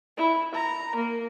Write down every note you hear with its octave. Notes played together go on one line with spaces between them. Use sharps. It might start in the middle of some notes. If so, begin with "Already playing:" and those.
E4
A#5
A#3